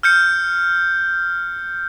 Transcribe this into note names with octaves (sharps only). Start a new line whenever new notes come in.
F6 G6 C#7